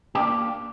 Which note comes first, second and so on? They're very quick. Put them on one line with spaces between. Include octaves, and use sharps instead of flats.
G4 D4 A#3